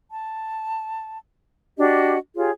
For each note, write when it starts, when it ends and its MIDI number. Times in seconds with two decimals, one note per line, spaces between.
0.09 1.17 81
1.78 2.17 62
1.78 2.17 66
1.78 2.17 67
1.78 2.17 75
2.36 2.51 65
2.36 2.51 67
2.36 2.51 68
2.36 2.51 73